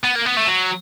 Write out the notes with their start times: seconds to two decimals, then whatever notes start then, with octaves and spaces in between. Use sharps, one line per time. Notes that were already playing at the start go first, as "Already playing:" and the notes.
0.04 B3
0.15 A#3
0.25 B3
0.36 A3
0.47 F#3